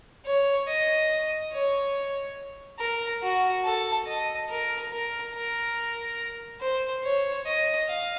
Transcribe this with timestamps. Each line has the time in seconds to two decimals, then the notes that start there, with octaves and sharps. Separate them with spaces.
0.26 C#5
0.68 D#5
1.52 C#5
2.80 A#4
3.23 F#4
3.64 A4
4.06 D#5
4.50 A#4
4.91 A#4
5.34 A#4
6.61 C5
7.04 C#5
7.46 D#5
7.88 F5